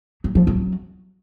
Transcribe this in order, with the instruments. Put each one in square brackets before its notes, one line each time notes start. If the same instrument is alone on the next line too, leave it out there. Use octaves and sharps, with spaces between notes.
[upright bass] F#3
F3
F#3